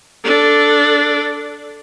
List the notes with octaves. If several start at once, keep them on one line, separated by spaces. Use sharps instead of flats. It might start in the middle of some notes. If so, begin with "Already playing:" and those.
D4 A4